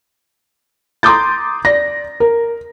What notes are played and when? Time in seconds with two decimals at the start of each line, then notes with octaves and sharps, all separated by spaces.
1.03 A#5 C6 D6 D#6 G6 A6
1.65 D5 A#6
2.20 A#4